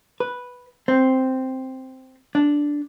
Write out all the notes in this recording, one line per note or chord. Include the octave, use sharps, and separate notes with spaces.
B4
C4
D4